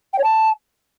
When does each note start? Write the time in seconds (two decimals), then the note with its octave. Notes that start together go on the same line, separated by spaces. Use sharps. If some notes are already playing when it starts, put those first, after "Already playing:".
0.13 G5
0.19 C#5
0.24 A5